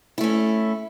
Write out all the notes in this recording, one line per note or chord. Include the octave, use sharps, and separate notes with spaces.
A3 C#4 E4